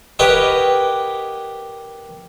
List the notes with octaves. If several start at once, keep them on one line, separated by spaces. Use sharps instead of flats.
G4 A#4 B4 C#5 D#5 F#5